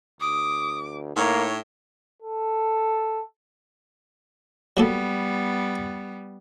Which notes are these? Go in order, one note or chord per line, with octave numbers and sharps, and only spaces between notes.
D2 D6 D#6
A2 A#3 D#4 C#5
A4
F#3 G3 A#3 B3 A4